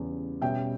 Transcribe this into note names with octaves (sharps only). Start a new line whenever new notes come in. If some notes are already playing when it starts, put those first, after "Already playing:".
Already playing: E2 C#3 G3
B2 G3 C#4 E5 G5